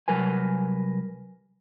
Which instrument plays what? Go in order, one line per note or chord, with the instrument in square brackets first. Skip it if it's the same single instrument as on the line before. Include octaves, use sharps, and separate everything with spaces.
[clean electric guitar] C2 F#3 A#4 B4 G#5